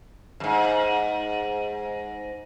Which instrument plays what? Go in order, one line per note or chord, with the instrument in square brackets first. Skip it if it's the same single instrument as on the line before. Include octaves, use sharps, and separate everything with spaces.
[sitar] F2 G#2